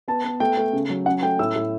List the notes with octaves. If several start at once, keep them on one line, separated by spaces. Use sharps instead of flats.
B3 A5
B3
A3 G5
A3
C#3
F#3
C#4 F#5
A3 G5
A2 E6
A2